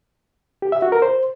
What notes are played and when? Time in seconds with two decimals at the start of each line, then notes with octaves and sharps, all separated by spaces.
0.62 G4
0.72 E5
0.82 F#4
0.92 A#4
1.02 C5